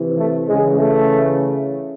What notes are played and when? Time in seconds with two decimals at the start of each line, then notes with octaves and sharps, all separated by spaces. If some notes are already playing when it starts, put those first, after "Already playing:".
Already playing: C3 E3
0.18 A3
0.48 C#3 E3 G#3
0.78 A3